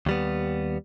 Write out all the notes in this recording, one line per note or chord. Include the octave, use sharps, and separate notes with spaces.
D#2 G3 B3